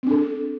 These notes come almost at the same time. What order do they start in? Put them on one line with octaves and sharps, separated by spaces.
C4 D4 A4